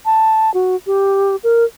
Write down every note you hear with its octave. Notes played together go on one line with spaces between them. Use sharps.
A5
F#4
G4
A#4